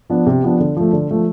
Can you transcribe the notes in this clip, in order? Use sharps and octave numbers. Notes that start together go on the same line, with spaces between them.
F3 B3 D4
C3
F3 B3 D4
D3
F3 A3
D3
F3 A3